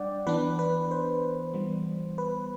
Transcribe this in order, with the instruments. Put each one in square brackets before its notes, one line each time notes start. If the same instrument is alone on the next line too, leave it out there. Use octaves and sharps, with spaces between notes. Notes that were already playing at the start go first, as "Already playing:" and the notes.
Already playing: [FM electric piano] G3 D4 D5 F#5 G5
E3 B3 D4 B4
B4
C5
E3 G3 B3
B4